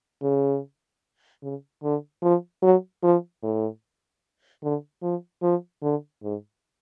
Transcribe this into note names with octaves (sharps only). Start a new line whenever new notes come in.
C#3
C#3
D3
F3
F#3
F3
A2
D3
F3
F3
D3
G#2